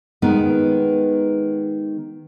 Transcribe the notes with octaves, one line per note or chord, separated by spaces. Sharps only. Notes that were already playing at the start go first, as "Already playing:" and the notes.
D#3 G#3 B3